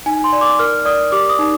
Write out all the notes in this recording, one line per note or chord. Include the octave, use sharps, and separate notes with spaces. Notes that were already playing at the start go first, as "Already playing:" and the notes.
D#4 G#5
C6
D5
D6
A#4 F6
D5 D#6
G4 D6
D#6
D#4